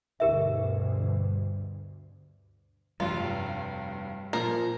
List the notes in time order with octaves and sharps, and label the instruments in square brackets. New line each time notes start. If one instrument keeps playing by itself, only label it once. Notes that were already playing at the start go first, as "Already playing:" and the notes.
[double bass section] D2 G2 B2 [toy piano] G4 A#4 E5
[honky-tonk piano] F1 G2 [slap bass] F#3 G3 [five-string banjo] F4
[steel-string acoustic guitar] A#2 F3 [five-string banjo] A#4